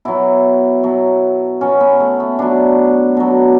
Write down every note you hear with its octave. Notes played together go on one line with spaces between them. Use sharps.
B2 F#3 E4
B2 F#3
B2 F#3 C#4
B3
A3
B3
B2 F#3 D4
B2 F#3